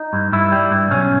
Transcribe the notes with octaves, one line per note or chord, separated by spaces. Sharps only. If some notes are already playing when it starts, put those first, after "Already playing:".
Already playing: D#4
G2
G2 E4
G3
G2
B1 C#4